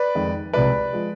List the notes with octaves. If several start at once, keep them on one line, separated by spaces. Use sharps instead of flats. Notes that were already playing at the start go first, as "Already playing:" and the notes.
Already playing: B4 D5
F2 D#3 G#3
C2 C3 F3 G#3 B4 D5
F3 G#3